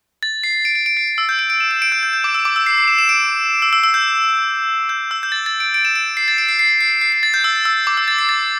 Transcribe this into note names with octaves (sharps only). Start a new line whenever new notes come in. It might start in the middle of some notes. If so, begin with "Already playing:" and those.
A6
C7
D7
D7
D7
C7
D7
E6
G6
D7
D7
E7
E7
D7
G6
G6
G6
D6
E6
D6
E6
C7
C7
E7
E7
D7
E6
E6
E6
G6
G6
E6
G6
A6
A6
D7
D7
E7
D7
C7
A6
D7
C7
C7
C7
C7
C7
A6
G6
E6
E6
D6
E6
A6
C7
A6